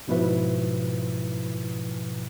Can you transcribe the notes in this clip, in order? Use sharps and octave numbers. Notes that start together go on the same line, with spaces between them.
G#2 B2 F3 E4 B4 E5